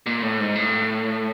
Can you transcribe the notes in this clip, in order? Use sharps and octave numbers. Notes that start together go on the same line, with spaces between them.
A#2
A2
G#2
A2